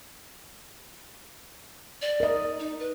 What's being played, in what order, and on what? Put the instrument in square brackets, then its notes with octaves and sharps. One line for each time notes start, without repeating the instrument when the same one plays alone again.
[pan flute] D5
[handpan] A#4 D#5
[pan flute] D#4
B4